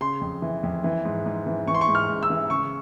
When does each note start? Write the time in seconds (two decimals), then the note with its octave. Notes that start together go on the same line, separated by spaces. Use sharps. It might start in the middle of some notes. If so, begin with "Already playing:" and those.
0.01 C#3 C6
0.21 F2
0.42 E3
0.63 F2
0.84 E3
1.05 G#2
1.26 G#2
1.47 E3
1.68 E3 C#6
1.74 C6
1.81 C#6
1.88 G#2
1.95 F6
2.08 G#2
2.23 E6
2.30 E3
2.50 C#3 C#6